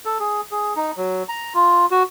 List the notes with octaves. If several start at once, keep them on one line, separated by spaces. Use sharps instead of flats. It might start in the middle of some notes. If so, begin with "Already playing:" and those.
A4
G#4
G#4
D#4
F#3
A#5
F4
F#4